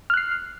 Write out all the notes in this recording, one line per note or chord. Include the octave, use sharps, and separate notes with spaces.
F6 F#6 C7